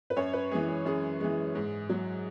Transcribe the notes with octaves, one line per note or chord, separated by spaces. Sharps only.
B4
F#2 C#5
B4
E3 G#3 G#4
G#4
F#2 G#4
E3 G#3
G#2
F#3